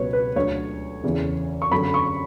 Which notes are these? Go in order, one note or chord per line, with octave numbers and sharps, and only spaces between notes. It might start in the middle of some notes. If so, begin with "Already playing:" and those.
Already playing: C#2 B2 F#3 B4 C#5
B4
D2 D3 F#3 C#5
E2 C#3 E3
C#6
F#2 D3 F#3 B5
C#6